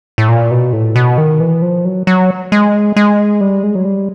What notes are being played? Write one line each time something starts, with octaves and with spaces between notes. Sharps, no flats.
A2
A#2
B2
A2
B2
D#3
E3
F3
F#3
F#3
G#3
G#3
G3
G#3
F#3
G3